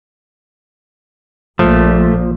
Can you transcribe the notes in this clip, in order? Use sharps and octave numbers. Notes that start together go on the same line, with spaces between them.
A#1 A#2 F3 A3